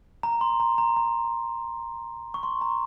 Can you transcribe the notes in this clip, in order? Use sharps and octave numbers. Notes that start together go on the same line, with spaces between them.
A#5
C6
A#5
A#5
A#5
C#6
C6
A#5